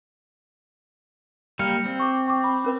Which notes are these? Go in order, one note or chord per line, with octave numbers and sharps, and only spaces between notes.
G3 A#3 F6 C#7
C4
C#6 D6
G5 C#6 D6
B5 D6
C#4 A#4 B4